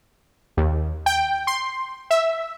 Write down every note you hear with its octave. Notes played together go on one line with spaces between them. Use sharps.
D#2
G5
C6
E5